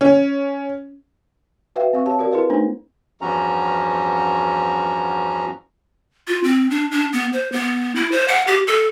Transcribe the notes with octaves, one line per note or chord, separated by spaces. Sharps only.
C#4
F#4 B4 E5 F5 G5
C4 F5 C#6
G4 C#5 F5 A5
F#4 G4 A#4 D5
E4 G#4 A#4 B4 D#5 F5
A3 B3 D4 D#4 C5
E2 G2 F3 C#4 F#4 A#5
F4
C4
D4
D4
B3
C5
B3
E4
C5
F#5
G4
A4